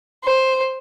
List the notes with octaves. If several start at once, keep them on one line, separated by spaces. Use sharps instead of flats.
C5